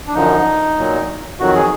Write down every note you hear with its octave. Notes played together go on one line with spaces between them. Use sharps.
D4
F#2 D3 F3 D#4
A#2 F#3
F2 D#3 F#3 F#4
G#4